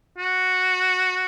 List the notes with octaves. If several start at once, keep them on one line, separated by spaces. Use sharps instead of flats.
F#4